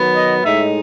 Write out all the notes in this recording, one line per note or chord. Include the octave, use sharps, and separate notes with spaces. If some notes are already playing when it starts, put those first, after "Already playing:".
Already playing: D#3 F#3 B3
D#5
A2 G#3 D#4 E5